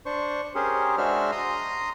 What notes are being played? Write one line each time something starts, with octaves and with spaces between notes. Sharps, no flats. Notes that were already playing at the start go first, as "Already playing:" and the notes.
D4 C5 C#6
C#4 G4 G#4 A#4 C5
G#3 D4 F#4 C5 E5 F6
A#5 C6 D#6